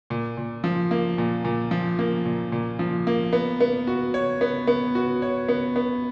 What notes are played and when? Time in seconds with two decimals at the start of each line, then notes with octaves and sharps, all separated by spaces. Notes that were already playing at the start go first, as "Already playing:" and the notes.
0.10 A#2
0.37 A#2
0.64 F3
0.91 A#3
1.18 A#2
1.45 A#2
1.71 F3
1.99 A#3
2.26 A#2
2.52 A#2
2.79 F3
3.07 A#3
3.33 B3
3.60 B3
3.87 F#4
4.14 C#5
4.41 B3
4.67 B3
4.95 F#4
5.22 C#5
5.48 B3
5.76 B3